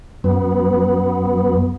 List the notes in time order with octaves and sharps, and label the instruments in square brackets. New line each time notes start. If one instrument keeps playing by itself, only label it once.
[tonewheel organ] F#2 B3